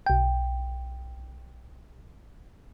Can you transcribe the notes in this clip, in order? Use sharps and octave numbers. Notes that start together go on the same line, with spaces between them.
B1 G5